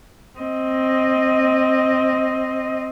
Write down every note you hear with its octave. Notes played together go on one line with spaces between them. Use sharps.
C4 D#5